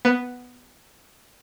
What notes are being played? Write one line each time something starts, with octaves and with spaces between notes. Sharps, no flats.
B3